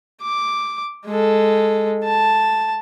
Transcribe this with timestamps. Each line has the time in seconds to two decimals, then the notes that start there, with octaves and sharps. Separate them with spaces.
0.22 D6
1.06 G#3 A4
2.04 A5